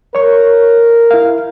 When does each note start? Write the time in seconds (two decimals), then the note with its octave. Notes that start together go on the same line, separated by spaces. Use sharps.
0.15 A#4 C#5 C#6
1.11 E4 F5